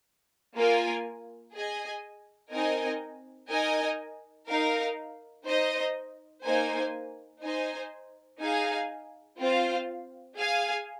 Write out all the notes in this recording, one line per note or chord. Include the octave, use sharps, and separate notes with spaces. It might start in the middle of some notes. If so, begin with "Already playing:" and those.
A#3 F4 A#4 G#5
G#4 D#5 G#5
C4 D#4 A#4 D#5 G#5
D#4 A#4 D#5 G#5
D#4 A#4 F5
D#4 C5 D#5
A#3 D#4 C5 G#5
D#4 C5 D#5 G#5
D#4 G#4 F5 G#5
C4 F4 C5 F5
G#4 F5 G#5